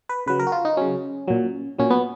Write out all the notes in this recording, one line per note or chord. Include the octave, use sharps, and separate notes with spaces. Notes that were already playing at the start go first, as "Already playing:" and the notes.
B4
C#3 F#3 B4
A#4
F#4
F4
D#4
C#3 F#3 C#4
A#2 F#3
A#2 F#3 C#4
B3